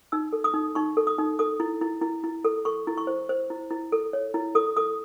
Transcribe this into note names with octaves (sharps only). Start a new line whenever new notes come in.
D#4 E6
A4
D#6
D#4
D#4 C#6
A4
D#6
D#4
A4 D#6
E4
E4
E4
E4
A4
A4 C#6
E4
C#6
C5
C5
E4
E4
A4
C#5
E4
A4 D#6
A4 D#6